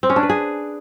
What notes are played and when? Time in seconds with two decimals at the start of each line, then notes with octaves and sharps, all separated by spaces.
0.03 C4
0.10 C#4
0.16 D4
0.23 B4
0.30 G#4